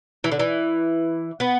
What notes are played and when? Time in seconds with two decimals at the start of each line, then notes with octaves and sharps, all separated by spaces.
0.24 E3
0.32 D3
0.39 E3
1.40 B3